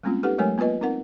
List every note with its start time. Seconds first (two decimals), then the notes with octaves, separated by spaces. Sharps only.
0.03 G3 G#3 A#3 C4 C#4 F4
0.23 D#4 G4 A4 B4 F#5
0.38 F#3 G#3 A3 A#4 C#5 G#5
0.58 A#3 B3 F4 B4 D#5
0.81 C4 D#4 A#4 F#5